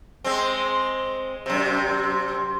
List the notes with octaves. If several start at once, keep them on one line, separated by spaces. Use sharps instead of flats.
G#3 C4
F#2 C3